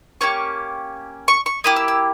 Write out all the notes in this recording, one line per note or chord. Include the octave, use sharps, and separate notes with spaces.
A#3 C#4 G4 C#6
C#6
C#6
A#3 E4 G4 D#6
E6
E6